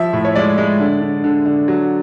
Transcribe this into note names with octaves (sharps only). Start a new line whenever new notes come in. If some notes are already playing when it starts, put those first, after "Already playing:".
Already playing: F3 E5
A2
C#5
G#3 D5
G#3
D3
D3
D3
D3
F#3